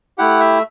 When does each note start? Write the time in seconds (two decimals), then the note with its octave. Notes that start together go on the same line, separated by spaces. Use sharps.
0.18 A3 E4 G4 F#5
0.40 E5